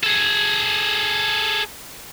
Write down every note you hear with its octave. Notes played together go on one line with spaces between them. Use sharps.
G#4 A4